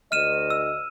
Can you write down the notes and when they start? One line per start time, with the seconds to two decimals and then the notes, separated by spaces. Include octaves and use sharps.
0.12 D2 D#5 F6 D#7 E7
0.50 E6